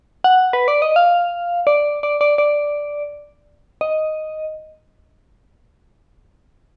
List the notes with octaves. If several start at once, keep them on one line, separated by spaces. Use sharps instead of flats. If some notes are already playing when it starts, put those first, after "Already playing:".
F#5
B4
D5
D#5
F5
D5
D5
D5
D5
D#5